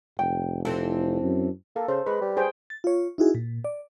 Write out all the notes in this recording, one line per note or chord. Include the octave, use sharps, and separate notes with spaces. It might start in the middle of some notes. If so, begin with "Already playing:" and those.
F1 G5
E3 C4 E4 A4
F#2
A#3 A4
C#3 C5
G#3 B4
G3
G#4 C5 G5
A6
F4 C#5
D#4 E4 F#4 G#4
A#2
D5